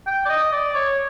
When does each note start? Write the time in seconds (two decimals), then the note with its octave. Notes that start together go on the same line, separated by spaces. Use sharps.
0.07 G5
0.26 D5
0.29 D#5
0.53 D5
0.75 C#5